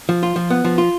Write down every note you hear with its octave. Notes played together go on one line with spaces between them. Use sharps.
F3
F4
F3
B3
F3
F4